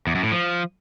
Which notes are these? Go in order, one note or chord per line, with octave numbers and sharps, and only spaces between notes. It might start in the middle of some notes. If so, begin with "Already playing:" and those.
E2
F#2
A2
F3